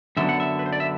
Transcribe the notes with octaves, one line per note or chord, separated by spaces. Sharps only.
F#2 D3 F#3 B3 D4 E5
F#5
E5
B4
C5
D5
E5